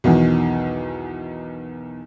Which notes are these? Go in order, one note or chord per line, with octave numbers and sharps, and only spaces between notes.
B1 E2 D#3 E3